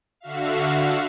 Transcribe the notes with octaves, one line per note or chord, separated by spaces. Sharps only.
D3 F#4 E5 F5